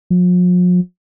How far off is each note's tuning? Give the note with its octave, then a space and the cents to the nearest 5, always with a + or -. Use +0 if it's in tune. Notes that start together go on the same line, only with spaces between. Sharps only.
F3 +45